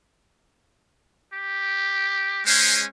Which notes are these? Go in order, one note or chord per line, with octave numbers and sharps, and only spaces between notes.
G4
G#3 C#4 C5